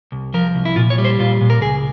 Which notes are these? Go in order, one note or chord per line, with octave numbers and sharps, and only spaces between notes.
C2
F3 A#4
C2
E4
A#2 F4
C#5
G3
C5
A#2 F4
A#2
A#4
C#2 G#4